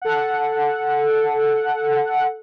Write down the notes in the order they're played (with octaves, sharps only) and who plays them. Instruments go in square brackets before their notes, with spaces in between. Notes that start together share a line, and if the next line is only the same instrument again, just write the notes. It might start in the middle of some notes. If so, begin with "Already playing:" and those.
[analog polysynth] A4 F#5